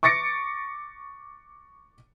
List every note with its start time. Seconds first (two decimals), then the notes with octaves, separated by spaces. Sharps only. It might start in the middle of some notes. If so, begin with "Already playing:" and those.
0.03 C#6 D6 A6 A#6 C#7 D7